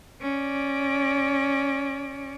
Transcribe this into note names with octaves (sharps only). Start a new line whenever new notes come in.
C#4 D5